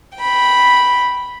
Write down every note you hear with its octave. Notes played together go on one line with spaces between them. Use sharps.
G5 B5